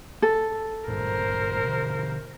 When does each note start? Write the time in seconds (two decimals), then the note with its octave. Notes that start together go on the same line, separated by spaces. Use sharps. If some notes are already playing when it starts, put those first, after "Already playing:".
0.22 A4
0.88 G#1 G2 A#2 A#4 C5
1.64 B2 D3